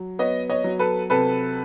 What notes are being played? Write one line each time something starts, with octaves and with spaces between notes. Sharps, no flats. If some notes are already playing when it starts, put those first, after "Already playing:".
Already playing: F#3
B3 C#5 D#5
C#5 D#5
F#3
A4 B4
C3 A4 B4